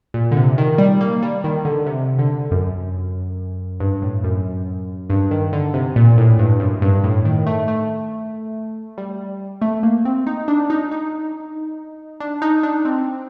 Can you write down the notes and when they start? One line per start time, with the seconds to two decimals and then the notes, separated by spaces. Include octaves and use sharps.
0.14 A#2
0.31 D3
0.36 C3
0.58 D#3
0.78 G3
1.01 A#3
1.23 G3
1.44 D#3
1.65 D3
1.87 C3
2.19 D3
2.51 F#2
3.80 G2
4.02 A2
4.24 F#2
5.10 G2
5.31 D#3
5.53 D3
5.74 C3
5.96 A#2
6.18 A2
6.39 G2
6.60 F#2
6.82 G2
7.04 A2
7.25 D#3
7.46 A3
7.68 A3
8.98 G3
9.62 A3
9.83 A#3
10.05 C4
10.27 D#4
10.48 D4
10.70 D#4
10.91 D#4
12.20 D4
12.42 D#4
12.63 D4
12.85 C4